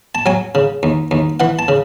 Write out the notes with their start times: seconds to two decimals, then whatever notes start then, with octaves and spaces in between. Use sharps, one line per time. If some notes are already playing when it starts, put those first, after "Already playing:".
0.15 A5
0.26 F#3 G#5
0.55 C#3
0.83 D#2
1.11 D#2
1.40 E3 F#5
1.59 A5
1.68 C#3